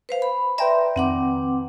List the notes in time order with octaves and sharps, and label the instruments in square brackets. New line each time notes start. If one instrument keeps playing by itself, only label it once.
[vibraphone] B4 C5 F5
B5
[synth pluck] B4 G5 A#5 [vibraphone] D5 E5 C6
[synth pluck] F2 D#3 [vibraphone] C4 F#5 D6